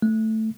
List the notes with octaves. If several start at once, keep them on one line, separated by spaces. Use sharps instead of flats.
A3